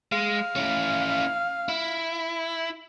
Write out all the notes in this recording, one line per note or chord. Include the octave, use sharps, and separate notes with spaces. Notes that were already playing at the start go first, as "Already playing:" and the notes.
G#3 F5
C#4 E4
E4